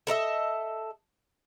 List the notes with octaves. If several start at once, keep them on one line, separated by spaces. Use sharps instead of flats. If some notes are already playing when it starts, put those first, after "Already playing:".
A4 A#4 D#5 E5